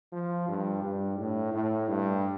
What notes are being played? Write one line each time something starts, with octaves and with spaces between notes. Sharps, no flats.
F3
G2
G2
A2
A2
G2